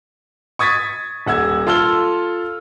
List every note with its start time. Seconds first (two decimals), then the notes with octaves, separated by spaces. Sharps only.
0.59 C#6 D#6 G#6 A6 B6
1.27 D#1 F#5 E6 G#6
1.67 F4 A4 E6 F6 G7